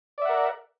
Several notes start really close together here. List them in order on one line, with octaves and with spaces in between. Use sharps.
D5 E5 F#5 A#4